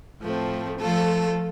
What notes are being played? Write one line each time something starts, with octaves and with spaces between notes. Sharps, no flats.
A2 F3 A3 C4
F3 A3 F4 A4